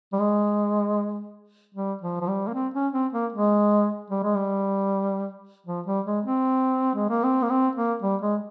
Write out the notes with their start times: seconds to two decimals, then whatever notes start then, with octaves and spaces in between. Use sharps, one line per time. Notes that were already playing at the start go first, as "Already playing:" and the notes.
0.13 G3
0.19 G#3
1.75 G3
2.02 F3
2.21 F3
2.28 G3
2.48 A#3
2.54 C4
2.74 C#4
2.93 C4
3.13 A#3
3.32 G#3
4.10 G3
4.23 G#3
4.36 G3
5.67 F3
5.86 G3
6.06 G#3
6.25 C4
6.95 G#3
7.09 A#3
7.24 C4
7.42 A#3
7.50 C4
7.75 A#3
8.02 G3
8.21 G#3